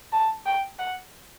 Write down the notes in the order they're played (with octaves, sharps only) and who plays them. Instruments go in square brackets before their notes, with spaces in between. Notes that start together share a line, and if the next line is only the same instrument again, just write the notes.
[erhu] A5
G5
F#5